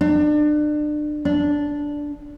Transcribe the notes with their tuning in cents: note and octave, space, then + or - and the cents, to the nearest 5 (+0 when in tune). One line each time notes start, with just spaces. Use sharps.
D4 +30
D4 -5